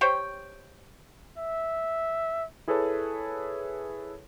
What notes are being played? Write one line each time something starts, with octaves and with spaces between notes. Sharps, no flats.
G4 C5 C#5 G5
E5
E4 G#4 A4 B4 C#5 A5